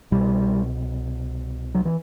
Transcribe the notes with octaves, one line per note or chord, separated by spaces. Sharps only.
C2 B2 G3
F#3
E3